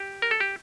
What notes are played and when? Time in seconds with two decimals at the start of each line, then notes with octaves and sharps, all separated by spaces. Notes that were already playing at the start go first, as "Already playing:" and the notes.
Already playing: G4
0.22 A#4
0.31 A4
0.40 G4